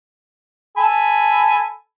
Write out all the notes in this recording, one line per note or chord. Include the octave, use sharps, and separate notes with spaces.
A4 G#5 B5